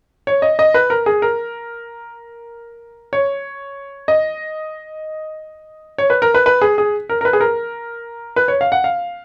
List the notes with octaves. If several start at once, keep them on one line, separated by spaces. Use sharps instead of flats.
C#5
D#5
D#5
B4
A#4
G#4
A#4
C#5
D#5
C#5
B4
A#4
B4
B4
G#4
G#4
A#4
A#4
B4
G#4
A#4
B4
C#5
F5
F#5
F5